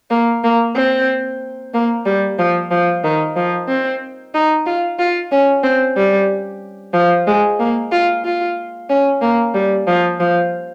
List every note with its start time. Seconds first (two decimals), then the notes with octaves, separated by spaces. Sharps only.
0.10 A#3
0.44 A#3
0.76 C4
1.74 A#3
2.06 G3
2.38 F3
2.71 F3
3.04 D#3
3.36 F3
3.68 C4
4.34 D#4
4.66 F4
4.99 F4
5.31 C#4
5.63 C4
5.97 G3
6.94 F3
7.27 G#3
7.59 A#3
7.92 F4
8.25 F4
8.90 C#4
9.22 A#3
9.54 G3
9.87 F3
10.20 F3